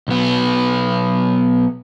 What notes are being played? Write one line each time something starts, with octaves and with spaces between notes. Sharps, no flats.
B1 B3